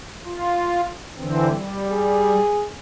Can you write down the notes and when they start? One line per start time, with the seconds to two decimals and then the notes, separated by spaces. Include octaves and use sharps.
0.24 F4
1.17 D3 E3 C4
1.48 G3
1.90 G#4